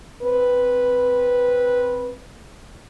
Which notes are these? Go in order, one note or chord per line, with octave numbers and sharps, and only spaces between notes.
C4 B4